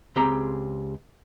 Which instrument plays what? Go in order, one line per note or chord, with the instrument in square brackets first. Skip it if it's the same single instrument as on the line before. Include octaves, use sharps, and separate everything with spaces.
[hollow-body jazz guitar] C#2 C4 G4 G#4 A#5